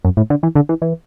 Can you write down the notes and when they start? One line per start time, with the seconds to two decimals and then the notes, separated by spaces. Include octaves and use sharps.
0.05 F#2
0.17 A2
0.30 D3
0.43 E3
0.55 D3
0.69 E3
0.82 E3